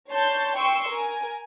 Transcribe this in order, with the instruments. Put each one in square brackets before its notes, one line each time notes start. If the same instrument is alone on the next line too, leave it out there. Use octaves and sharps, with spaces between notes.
[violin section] C#5 A5 C6 G6
G5 C6 C#6 E6
A#4 G#5